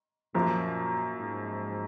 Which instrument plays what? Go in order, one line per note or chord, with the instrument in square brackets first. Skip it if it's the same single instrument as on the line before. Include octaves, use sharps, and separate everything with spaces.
[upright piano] F#2 F3 A#3 [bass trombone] A#2
[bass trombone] G#2